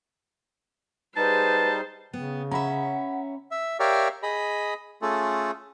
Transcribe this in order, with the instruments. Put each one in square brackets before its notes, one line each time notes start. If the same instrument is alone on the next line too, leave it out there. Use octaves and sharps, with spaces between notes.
[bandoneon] G3 D#4 [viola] G#4 C5 [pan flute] B4 [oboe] A5
[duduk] C#3 [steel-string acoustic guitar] B3 [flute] G5
[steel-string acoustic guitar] C#4 E5 [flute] F#5 [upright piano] A#5 B5
[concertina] E5
G4 A#4 C#5 D5 E5 F5
G#4 D#5 B5
A3 C#4 F4 G#4 A4